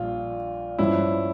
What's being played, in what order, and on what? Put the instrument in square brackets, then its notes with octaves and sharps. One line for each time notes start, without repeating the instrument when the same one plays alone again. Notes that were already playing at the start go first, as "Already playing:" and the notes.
Already playing: [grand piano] A#1 A#2 G3 D4 [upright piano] F4
[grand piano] G2 F3 C#4 [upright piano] E4